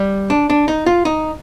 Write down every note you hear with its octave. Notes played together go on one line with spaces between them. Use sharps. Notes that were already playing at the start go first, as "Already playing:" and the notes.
Already playing: G3
D4
D4
D#4
F4
D#4